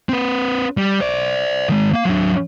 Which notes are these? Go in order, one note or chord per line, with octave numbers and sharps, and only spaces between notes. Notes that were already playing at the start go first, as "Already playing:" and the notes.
C4 B4
G3
C5 D5
D#3 G#3
A#3 F5
F#3 D4